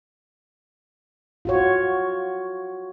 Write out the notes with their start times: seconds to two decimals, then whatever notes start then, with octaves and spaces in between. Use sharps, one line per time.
1.45 F4 F#4 C#5